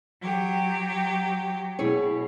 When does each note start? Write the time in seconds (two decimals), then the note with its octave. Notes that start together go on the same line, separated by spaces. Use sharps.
0.21 F#3 G4
1.79 B2 E4 G#4 C#5